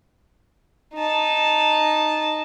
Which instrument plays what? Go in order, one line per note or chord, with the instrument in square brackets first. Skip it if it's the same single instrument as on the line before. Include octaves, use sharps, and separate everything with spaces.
[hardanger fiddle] D#4 A5